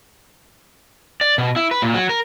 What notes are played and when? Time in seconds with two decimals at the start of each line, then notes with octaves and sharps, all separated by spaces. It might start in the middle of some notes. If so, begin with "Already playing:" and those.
1.21 D5
1.38 B2
1.56 E4
1.71 B4
1.82 A#2
1.94 F#3
2.09 A#4